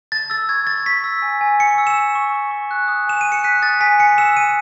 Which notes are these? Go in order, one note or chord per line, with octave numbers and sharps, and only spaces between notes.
A5 A6
E6 A6
C#6 G#6
C#6 A6
C#6 B6
E6
G#5
G#5
C#6 C#7
E6
E7
G#5
C#6
E6
C#6
F#6
D#6
G#5 E7
F#6 D#7
C#7
F#6 B6
D#6 A6
G#5 B6
G#5 C#7
E6 E7
G#5 D#7